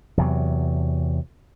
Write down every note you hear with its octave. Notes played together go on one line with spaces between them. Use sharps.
E2 C3 F#3